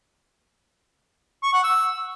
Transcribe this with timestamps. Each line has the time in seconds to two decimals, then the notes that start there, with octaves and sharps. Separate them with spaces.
1.43 C#6
1.53 F#5
1.64 E6